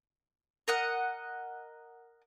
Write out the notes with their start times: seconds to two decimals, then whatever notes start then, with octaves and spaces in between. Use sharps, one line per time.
0.68 A#4 D#5 F#5